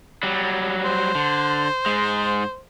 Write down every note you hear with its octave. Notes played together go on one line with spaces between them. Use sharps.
F#3 G3
C5
D3
G#2 G#3